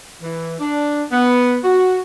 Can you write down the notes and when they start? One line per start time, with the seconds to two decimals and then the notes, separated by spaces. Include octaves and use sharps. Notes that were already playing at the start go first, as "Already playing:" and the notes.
0.22 E3
0.60 D4
1.12 B3
1.64 F#4